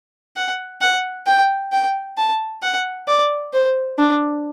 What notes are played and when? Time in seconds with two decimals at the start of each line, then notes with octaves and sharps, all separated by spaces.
0.36 F#5
0.81 F#5
1.27 G5
1.72 G5
2.17 A5
2.62 F#5
3.07 D5
3.53 C5
3.98 D4